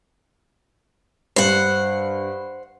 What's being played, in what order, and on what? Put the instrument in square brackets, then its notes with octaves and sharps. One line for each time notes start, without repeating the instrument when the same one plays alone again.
[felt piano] G2 [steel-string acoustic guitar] C5 F#5